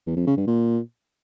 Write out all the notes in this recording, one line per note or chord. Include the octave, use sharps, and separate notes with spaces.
E2
F2
C#3
G2
A#2